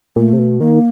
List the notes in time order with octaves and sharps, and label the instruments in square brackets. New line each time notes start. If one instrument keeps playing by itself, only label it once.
[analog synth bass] A#2 [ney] A3
[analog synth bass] C3
B2
[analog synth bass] D#3 [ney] A#3